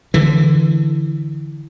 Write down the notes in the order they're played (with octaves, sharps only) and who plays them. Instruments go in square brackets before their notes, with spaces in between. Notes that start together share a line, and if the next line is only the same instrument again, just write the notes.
[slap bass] D3 E3